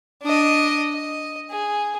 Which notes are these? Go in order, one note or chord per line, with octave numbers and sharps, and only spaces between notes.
D4 D#5
D#5
G#4